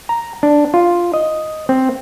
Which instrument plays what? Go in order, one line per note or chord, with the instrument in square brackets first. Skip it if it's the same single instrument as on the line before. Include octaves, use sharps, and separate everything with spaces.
[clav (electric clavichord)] A#5
D4
F4
D#5
C4